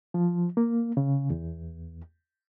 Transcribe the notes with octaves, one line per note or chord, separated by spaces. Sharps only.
F3
A#3
C#3
E2